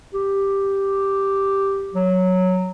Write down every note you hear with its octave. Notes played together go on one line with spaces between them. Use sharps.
G4
F#3